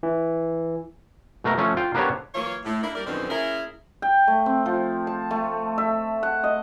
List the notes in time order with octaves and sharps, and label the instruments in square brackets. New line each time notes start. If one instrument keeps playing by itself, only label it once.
[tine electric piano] E3
[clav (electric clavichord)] B2 A3 A#4 A#5
F3 A3 C#4
F4 G5
A#3 B3 D4 G4 C5 C#5
[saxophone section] E3 F#3 A#3 F4 C#5
A2
A#3 D4 E4
G3 A#4 D5
F#2 B2 D3 D#3 F3 C4
A#3 C#4 E4 G#4 A#4
[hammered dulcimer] G5
A3
C4
F3
A5
A3
E5
F#5
D#5